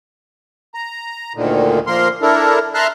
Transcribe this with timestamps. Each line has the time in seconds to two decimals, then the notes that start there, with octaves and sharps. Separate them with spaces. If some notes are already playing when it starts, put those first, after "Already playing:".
0.74 A#5
1.35 D2 A#2 D3 D#3
1.87 F3 A#3 A#4 C6
2.22 D4 E4 A4 A#4
2.74 E5 A5 A#5 C6 F6 F#6